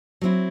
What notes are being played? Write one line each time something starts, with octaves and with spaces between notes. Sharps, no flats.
F#3 C4 E4